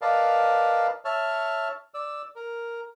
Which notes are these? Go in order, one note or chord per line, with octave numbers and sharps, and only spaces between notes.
A#4 B4 D5 D#5 F5 A5
C#5 E5 A5 F6
D5 E6
A#4